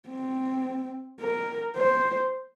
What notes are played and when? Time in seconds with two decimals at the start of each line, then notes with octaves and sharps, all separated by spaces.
0.09 C4
1.20 A#4
1.76 C5